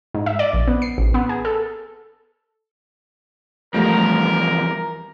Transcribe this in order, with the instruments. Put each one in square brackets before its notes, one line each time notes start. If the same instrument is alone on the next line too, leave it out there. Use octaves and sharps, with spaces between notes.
[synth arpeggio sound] G#2
E5
D5
A#1
B3
C7
A1
B3
G#4
A4
[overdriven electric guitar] E2 F3 [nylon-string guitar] G3 A3 F4 [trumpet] A#4